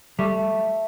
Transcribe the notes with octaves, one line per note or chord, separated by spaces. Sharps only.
G3 A3